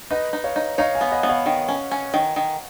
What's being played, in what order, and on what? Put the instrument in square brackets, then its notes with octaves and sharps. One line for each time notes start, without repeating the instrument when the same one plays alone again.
[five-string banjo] D#4 [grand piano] B4 D#5
[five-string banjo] D#4
[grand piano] C#5 F5
[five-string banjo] D#4
[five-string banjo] D#4 [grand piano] C#5 F5
[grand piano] F5 G#5
[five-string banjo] B3
[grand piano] D#5 F#5
[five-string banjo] B3
[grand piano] C#5 F5
[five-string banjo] D#3
C#4
C#4
D#3
D#3